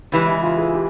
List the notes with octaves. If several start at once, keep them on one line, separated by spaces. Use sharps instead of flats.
C#3 E3 G#3 G4
E4
F4
G#4
G4